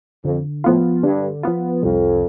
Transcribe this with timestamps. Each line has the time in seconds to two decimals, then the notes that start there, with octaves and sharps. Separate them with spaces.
0.24 F2 D3
0.64 A2 F3 B3 F4
1.03 G2 D3
1.43 F3 B3 F4
1.82 C2 F2